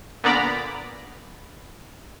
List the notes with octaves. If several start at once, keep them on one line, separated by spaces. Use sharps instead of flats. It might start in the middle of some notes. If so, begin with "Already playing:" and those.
A#2 D3 B3 D5 A#5 B5